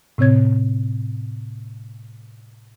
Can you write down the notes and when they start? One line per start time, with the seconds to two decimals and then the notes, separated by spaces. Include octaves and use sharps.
0.18 A2 C3 C4 C#5 G#6